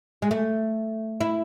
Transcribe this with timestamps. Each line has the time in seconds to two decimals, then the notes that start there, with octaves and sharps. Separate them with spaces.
0.22 G#3
0.31 A3
1.20 E4